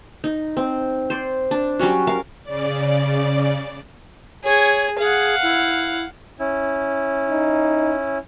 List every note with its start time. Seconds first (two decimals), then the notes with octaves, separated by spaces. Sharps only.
0.24 D#4
0.57 C4
1.10 C5 D5
1.51 D4
1.79 F#3 G3 C#4 F#4
2.07 A#4 F5
2.44 C#3 D5
4.44 G#4 C#5
4.99 G#4 F5 F#5
5.43 E4
6.39 C#4 E4
7.30 D#4